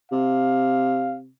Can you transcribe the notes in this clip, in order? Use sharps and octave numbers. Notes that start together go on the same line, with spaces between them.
C3 F5